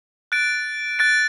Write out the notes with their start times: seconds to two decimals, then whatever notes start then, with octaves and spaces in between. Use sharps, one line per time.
0.32 F#6 A6 D7
0.99 F#6 A6 D7